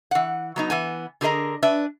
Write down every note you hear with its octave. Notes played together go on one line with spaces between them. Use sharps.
E3 F#5
F#3 B3 D#4
E3 B3 G#5
D3 G4 G#4 A#4 D#5 A#5
D4 B4 E5